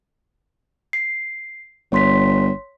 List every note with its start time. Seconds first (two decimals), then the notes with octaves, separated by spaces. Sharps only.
0.93 C7
1.92 G1 C#5 C6 B6